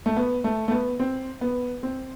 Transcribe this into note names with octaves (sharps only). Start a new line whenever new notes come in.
A3
B3
A3
A3
B3
C4
B3
C4